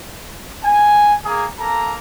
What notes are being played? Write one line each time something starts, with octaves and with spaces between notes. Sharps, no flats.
G#5
A#3 G#4
A#3 A4 A#5